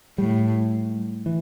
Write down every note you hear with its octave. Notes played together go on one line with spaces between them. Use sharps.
A2 G3
E3